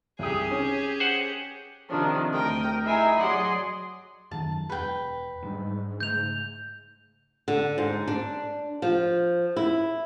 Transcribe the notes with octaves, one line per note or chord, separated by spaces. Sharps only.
C2 G4 G#4 D#6
C#4
C5 F#5
C3 D#3 F3 D4
D2 A3 A#4 G5 D#6
D#4 E4 G#4 E5 G#5 A#5
F#3 G#4 D5 D#5 F#5 C6
F#2 D#3 F#3 A5
E1 B4 G5
G#2 F#3 G3 D4
C#3 A3 G6 F7
D3
G#2
D4
F3
E4